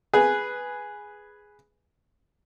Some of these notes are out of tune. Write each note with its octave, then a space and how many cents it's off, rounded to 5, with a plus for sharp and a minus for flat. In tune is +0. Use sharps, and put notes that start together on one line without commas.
G#4 +0 B4 +0